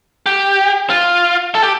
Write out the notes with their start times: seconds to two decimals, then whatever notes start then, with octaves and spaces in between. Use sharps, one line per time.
0.26 G4
0.90 F4
1.55 A4
1.63 G4